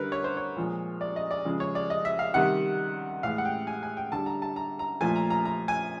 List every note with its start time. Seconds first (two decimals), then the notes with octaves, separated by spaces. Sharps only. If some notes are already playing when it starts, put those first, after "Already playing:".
Already playing: D3 G3 A#4 B4
0.12 C#5
0.24 C5
0.37 C#5
0.57 A#2 F3 G#3
1.01 D5
1.16 D#5
1.31 D5
1.45 C#3 F3 G#3
1.60 C#5
1.75 D5
1.90 D#5
2.05 E5
2.19 F5
2.34 C3 D#3 G3 F#5
3.23 A2 E3 G#3 F5
3.38 F#5
3.45 G5
3.67 G#5
3.83 G#5
3.97 G5
4.12 D3 G3 A5
4.26 A#5
4.42 A5
4.56 A#5
4.79 A#5
5.01 A#2 F3 A3 G#5
5.16 A#5
5.30 A#5
5.45 A#5
5.68 G#5